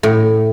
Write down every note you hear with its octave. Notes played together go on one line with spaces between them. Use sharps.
A2